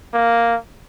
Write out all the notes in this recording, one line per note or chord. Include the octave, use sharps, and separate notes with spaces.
A#3